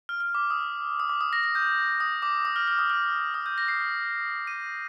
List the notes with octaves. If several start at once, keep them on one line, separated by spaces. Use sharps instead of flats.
F6
F6
D6
D#6
D#6
D6
D#6
A#6
A#6
G6
D#6
D6
D#6
F6
F6
D#6
F6
D#6
G6
A#6
C7
D#7